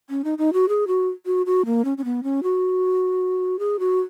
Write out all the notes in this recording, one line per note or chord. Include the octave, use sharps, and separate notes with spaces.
C#4
D#4
D#4
F#4
G#4
F#4
F#4
F#4
A#3
C#4
C#4
B3
C#4
F#4
G#4
F#4